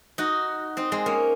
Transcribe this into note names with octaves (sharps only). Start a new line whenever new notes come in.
D#4 F#4
C4 D#4
G#3 C4
A#3 C#4